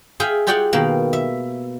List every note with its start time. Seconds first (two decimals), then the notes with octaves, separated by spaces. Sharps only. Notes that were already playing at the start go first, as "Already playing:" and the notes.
0.20 G#4 E5 F5 G5 G#5
0.47 F4 G4 G#4 D5 F#5 G5
0.73 B2 D#3 A#3
1.13 E5